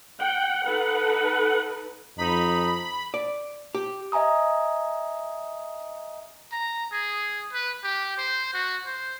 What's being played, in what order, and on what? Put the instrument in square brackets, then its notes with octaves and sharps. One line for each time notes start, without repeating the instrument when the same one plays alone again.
[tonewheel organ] F#5 [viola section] G5
[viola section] D#4 A4 B4
[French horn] F2 [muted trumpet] D#4 [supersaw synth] B5
[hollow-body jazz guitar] D5
G4
[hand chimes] D#5 E5 G#5 A#5 D#6
[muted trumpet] A#5
G#4
B4
G4
C5
F#4
C5